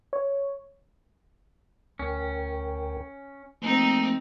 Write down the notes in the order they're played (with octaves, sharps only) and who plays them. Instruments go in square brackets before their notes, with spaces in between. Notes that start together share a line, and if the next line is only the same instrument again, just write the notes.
[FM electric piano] C#5
[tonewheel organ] D2 A#4 G5 [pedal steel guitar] C#4
[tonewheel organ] F3 A3 A#3 [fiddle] C4 D#4